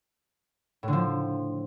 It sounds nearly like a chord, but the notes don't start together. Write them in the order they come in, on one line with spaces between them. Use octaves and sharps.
A2 D3 F3